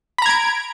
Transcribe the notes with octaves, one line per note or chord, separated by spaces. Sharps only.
A#5 B5 G#6 D7